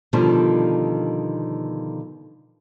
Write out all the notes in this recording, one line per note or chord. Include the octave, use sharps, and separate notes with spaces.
B2 D3 D#3 F3 G3